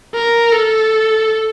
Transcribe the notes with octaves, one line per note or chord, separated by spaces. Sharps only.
A#4
A4